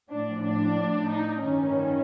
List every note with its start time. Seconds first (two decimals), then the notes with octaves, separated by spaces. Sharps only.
0.10 A2 F3 D4
0.44 D4
1.09 D#4
1.42 G2 D#3 C#4